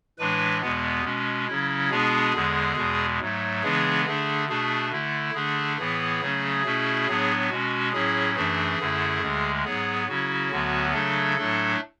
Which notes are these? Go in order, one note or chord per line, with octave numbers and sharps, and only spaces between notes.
A2 E3 G#3 D4 B4
E2 B2 G#3 B3
B2 G#3 C#4
C#3 F#3 C#4 E4
B2 G#3 B3 D4 G#4
E2 D3 G#3
E2 B2 G#3
G#2 F#3 A3
C#3 E3 G#3 B3 D4 G#4
D3 A3 D4 G#4
B2 A3 D4 G#4
D3 A3 E4
D3 A3 D4 G#4
A2 E3 B3 E4 G#4
C#3 F#3 A3 C#4
B2 A3 C#4 E4
A2 F#3 B3 D4
B2 G#3 C#4 F#4
A2 F#3 C#4 E4 G#4
F#2 E3 A3 D4 G#4
F#2 D3 A3 E4
D2 D3 G#3
G#2 F#3 B3 G#4
C#3 F#3 C#4 E4 F#4
D2 D3 F#3 B3
C#3 F#3 A3 D4 A4
A2 F#3 A3 D4